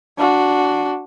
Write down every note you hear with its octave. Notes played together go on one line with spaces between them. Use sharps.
D4 F#4